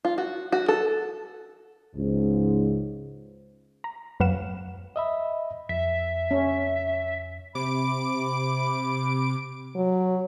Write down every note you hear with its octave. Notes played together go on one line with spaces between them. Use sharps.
F4
F#4
F#4
A4
C#2 G#2
A#5
F#2 F#3 B4 F5 F#5 E7
D#5 E5 B5
F2 E5
C#4
C3 B5 D6 D7
F#3 F#4